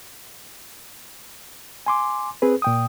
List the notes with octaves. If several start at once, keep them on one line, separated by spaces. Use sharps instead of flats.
G#5 C6 D6
C4 G#4 B4
A#2 G5 D#6